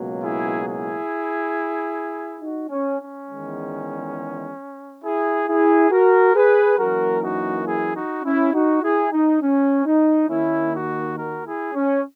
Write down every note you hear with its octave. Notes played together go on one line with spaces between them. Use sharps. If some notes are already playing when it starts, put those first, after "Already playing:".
Already playing: C#2 B2 F#3 A#3
E4 G#4
E4 G#4
D#4 F#4
C#4
C#4
E2 D#3 G#3
E4 G#4
E4 G#4
F#4 A#4
G#4 B4
F#2 E3 A#3 F#4 A#4
D#4 F#4
E4 G#4
D#4 F#4
C#4 E4
D#4 F#4
E4 G#4
D#4
C#4
D#4
D#2 D#3 A#3 C#4 E4
D#4 F#4
F#4 A#4
E4 G#4
C#4